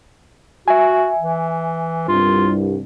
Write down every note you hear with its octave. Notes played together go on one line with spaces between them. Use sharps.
F#4 E5 G#5
E3
C2 G2 F4